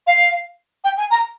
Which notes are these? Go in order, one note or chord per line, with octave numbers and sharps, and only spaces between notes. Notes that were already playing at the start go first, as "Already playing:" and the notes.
F5
G5
G#5
A#5